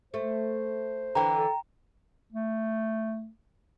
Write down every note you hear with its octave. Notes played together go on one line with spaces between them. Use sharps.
A3 C5
D3 E3 G5 A#5
A4
A3